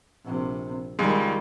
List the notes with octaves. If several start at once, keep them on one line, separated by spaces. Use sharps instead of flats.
A#1 C3
C#2 D#3 G3 G#3